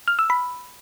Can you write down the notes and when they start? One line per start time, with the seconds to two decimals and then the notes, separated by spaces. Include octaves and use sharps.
0.08 F6
0.19 E6
0.30 B5